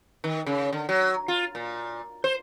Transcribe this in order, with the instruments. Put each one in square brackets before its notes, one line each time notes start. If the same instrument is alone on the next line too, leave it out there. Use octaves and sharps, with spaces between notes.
[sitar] D#3
C#3
D3
F#3
F4
A#2
C5